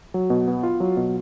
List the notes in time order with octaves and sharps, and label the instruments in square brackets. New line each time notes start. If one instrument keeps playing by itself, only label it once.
[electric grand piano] F#3
B2
B3
F4
F#3
B2